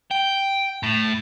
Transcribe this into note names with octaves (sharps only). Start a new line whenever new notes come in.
G5
A2